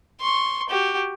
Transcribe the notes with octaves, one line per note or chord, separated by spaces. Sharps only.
C6 C#6
F#4 G4